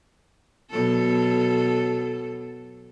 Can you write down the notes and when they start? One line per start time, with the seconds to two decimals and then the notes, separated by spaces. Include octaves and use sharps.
0.71 B2 F#3 A4